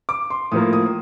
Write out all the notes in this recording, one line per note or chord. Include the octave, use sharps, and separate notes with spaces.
D6
C6
A2 F3 A#3 D#6
D#6